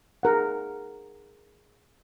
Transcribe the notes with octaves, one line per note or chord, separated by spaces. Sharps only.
G#4 A#4 F#5